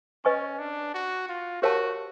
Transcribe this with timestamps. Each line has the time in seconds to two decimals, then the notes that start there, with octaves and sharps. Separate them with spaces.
0.25 C#4 B4 D#5 G#5 C#6
0.59 D4
0.94 F#4
1.29 F4
1.62 F#4 G4 A#4 C#5 F5 A5